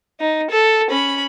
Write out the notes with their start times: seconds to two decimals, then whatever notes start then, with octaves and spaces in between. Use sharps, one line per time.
0.20 D#4
0.51 A4
0.90 C#4 B5